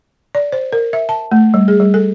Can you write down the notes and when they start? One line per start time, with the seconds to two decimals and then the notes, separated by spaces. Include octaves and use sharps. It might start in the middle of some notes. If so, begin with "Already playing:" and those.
0.35 D5
0.52 C5
0.72 A#4
0.93 E5
1.09 A5
1.31 A3
1.54 G3
1.68 G#4
1.80 G3
1.94 A4